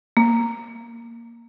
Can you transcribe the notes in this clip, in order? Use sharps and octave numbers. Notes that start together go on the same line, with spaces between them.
A#3